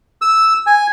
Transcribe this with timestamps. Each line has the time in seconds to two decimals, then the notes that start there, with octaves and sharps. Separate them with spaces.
0.21 E6
0.67 G#5